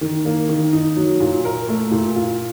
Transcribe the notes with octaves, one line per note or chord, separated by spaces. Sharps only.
D#3
A#3
D#3
D#4
F#3
A#2
A#4
A3
A#2
F4